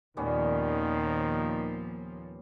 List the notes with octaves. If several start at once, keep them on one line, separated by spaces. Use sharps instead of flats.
D#2 A#2 D#3 F3 G3 B3 C#4